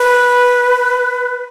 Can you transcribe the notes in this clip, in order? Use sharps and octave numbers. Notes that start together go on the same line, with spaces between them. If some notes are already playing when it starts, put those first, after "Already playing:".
Already playing: B4